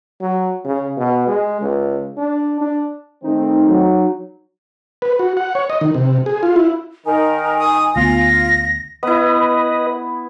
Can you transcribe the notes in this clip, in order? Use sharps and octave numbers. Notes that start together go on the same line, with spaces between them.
F#3
C#3
B2
G#3
C#2
D4
D4
D#3 A3 C4 D#4
F#3
B4
F#4
F#5
C#5
D#5
D#3
C3
G#4
F4
E4
D#3 D#4 A#4 G#5
D#6
D2 B3 F4 A#6
B3 E4 B4 D#5